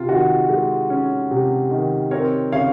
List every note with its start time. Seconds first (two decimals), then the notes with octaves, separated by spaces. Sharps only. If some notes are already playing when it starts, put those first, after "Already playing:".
Already playing: C3 F4
0.09 D#3 F#4
0.50 G#3
0.90 C#4
1.31 C3
1.71 D#3
2.11 C4 A#4 C#5
2.52 C#3 C#5 F5